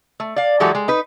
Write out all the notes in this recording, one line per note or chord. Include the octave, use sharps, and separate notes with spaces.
A3
D5 F5
E3 F#3 G#3 F#4 G4 A4
G#3
D#4 B4